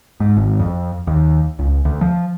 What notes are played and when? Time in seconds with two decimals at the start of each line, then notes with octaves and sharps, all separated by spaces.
0.20 G#2
0.37 G#1
0.60 F2
1.07 D#2
1.59 C#2
1.85 D2
2.01 F3